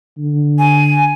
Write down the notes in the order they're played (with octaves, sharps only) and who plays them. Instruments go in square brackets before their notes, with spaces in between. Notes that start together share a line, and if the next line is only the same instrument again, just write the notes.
[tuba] D3
[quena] G#5